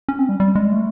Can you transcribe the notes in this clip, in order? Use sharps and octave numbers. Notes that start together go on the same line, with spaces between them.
C#4
C4
G3
G3
G#3
A3